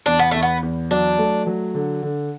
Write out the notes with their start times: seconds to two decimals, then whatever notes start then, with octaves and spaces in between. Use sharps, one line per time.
0.06 E2 D4
0.19 B3
0.31 E2 A3
0.42 B3
0.63 E2
0.91 F#3 D4
1.19 A3
1.47 F#3
1.74 D3
2.03 D3